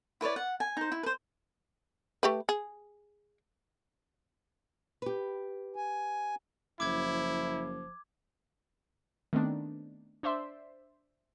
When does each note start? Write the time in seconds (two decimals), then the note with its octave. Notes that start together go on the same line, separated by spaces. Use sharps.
0.21 E4 B4 C#5 D5
0.36 F#5
0.60 G#5
0.77 D#4 C5
0.92 E4
1.03 B4 C5
2.23 A3 G4 B4
2.49 G#4
5.02 G4 B4
5.76 G#5
6.80 F#1 F3 E4 D6 G#6
9.33 D#3 A3 B3 C4 D4 D#4
10.23 D4 C5 D5 E5 C6